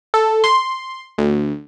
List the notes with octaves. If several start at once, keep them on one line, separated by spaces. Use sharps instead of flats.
A4
C6
D2